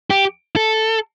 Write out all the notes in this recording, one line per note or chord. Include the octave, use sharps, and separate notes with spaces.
G4
A4